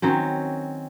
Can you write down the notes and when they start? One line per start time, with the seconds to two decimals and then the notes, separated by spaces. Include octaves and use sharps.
0.02 D#3 F#3 C4 C#4